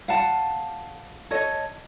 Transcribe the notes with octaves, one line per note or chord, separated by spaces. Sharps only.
F5 F#5 A5
A4 C#5 D#5